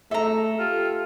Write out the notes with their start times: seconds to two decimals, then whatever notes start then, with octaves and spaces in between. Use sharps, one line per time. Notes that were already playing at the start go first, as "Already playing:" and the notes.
0.11 A3 A4 E5 A#5
0.59 F4 G4